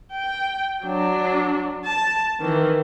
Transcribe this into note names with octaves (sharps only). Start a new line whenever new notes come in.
G5
F#3 D4
A5
D#3 E3